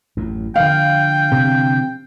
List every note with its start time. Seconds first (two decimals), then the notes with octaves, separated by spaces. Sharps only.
0.17 A1 F#2 A2
0.56 D3 F3 A#3 F5 G5
1.32 C3